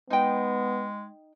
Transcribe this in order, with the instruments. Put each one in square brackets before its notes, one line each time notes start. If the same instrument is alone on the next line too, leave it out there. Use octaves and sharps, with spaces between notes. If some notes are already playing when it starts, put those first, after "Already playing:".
[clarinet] G#3 [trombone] B3 [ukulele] D#4 G5